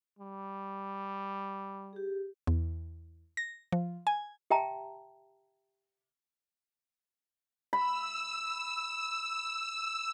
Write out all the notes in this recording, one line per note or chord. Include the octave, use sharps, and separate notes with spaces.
G3
G4 G#4
E2
A#6
F3
G#5
G4 E5 G5 A5 A#5
B5 E6